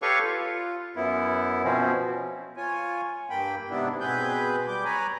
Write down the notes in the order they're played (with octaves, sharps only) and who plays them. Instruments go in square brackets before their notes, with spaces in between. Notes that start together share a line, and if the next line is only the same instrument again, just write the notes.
[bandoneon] G4 A4 B4 C#5 F5 C#6
F4
F#2 B3 E4
B2 F3 C4 C#4
[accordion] F4 C#5 G#5
G2 A#3 G5 B5
G#2 C3 B3 D4 E4
B2 C4 G#4 B4 B5 G6
G3 D6 G6
B4 C#5 G#5 A#5 B5